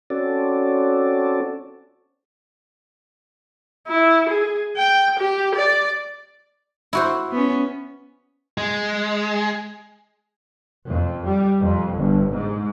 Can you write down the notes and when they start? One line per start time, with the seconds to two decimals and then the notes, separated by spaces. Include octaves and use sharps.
0.10 C4 C#4 F#4 A4 D5
3.87 E4
4.29 G#4
4.76 G5
5.19 G4
5.55 D5
6.93 E4 F#4 C5
7.31 B3 C#4
8.58 G#3
10.89 F2
11.26 G3
11.60 F2
11.97 G1
12.31 G#2